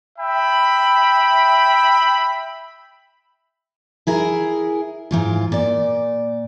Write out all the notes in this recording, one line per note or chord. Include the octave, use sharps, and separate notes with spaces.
E5 G5 B5
E4 G#4 A#4
G#2 E3 F4
A#2 D5